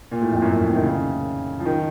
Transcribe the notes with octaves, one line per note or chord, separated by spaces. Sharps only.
A#2
A2
F2
F#2
F#2
C3
D#3
C#3
F3
D#3